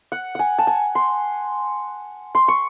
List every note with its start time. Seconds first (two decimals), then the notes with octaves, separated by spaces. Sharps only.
0.12 F#5
0.35 F#5 G#5
0.59 A5
0.67 G#5
0.95 C6
2.35 C6
2.48 C#6